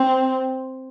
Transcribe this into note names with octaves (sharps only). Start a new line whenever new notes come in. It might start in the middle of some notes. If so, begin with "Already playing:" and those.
Already playing: C4